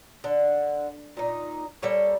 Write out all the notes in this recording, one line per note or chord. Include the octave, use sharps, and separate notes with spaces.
D3
A#2 D#4
G3 A#3 A4 C#5